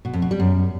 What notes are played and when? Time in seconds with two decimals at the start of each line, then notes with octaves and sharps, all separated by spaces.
0.05 B2
0.13 F2
0.22 B2
0.31 G3
0.40 F#2